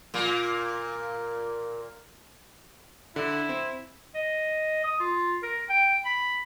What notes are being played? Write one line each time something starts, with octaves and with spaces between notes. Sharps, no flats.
A#2 A#3
D3 E4
C4
D#5
D#6
F4
A#4
G5
B5